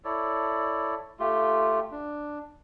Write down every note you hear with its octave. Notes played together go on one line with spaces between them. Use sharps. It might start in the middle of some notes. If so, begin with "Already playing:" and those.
E4 A4 C#5 D5
A3 F4 G4
D4